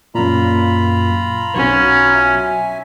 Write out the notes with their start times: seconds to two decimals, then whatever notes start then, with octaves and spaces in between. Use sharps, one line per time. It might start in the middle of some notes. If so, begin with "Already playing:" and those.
0.15 F#2 A#2 F4 A#5 B5
1.55 B1 C#4 F#4
2.14 E5 G#5